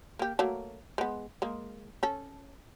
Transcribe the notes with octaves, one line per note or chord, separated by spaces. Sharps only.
A#3 G4
F#3 A3 A#3
G#3 B3
G#3 A#3
C#4 A4